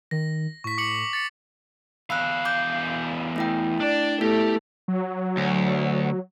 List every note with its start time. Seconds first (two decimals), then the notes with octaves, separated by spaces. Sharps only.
0.11 D#3 A#6
0.64 A2 C#6 B6
0.78 D6 C#7 F#7
1.13 A6 C#7
2.10 E2 F5 B5 E6 F#6
2.45 D6 G6
3.36 A3 E4 G5
3.80 D4 D5
4.21 A3 B3 E4 G4
4.88 F#3
5.37 D2